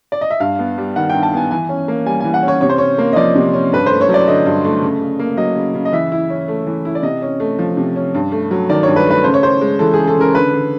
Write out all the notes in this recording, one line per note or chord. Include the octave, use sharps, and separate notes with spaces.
D5
D#5
E5
G2 F5
B3
G3
D#3 F#5
G5
G2
A5
B3 G#5
E3 G#5
C#4
A#3
G3 G#5
E3 G#5
F#5
C#4
C#5
C3 C#5
C5
C#4 C#5
A#3
D#5
F3 D5
C3
C#4
G2 B4
A3 C5
C#5
F#3
D5
D3 D#5
G2
A3
C#3
C#3
A#3
F#3 D#5
C#3
C#3
D#5
E3 E5
E4
C#4
A3
E3
E4
D5
C3 D#5
C#4
A3
F3
C3
C#4
G2
A3
F#3
D#3 D5
G2 C#5
B4
A3 B4
C#3 C5
C#5
C#3 C5
G#3
E3 A4
C#3 G#4
A4
C#3 A#4
D3 B4
D3